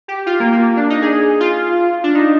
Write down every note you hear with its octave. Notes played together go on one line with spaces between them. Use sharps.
G4
F4
A#3
A#3
D4
D#4
G#4
F4
D4
D#4